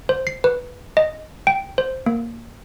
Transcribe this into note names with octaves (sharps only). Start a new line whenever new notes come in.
C5
C7
B4
D#5
G5
C5
A#3